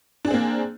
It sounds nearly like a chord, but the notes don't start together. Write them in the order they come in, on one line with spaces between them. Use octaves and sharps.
D4 G#4 C4 A#3